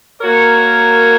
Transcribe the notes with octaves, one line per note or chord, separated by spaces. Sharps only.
A#3 F#4 A#4 C#5